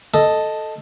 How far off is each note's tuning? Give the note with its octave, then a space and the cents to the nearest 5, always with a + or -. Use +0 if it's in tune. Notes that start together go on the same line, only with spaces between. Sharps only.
A4 +0 D#5 +0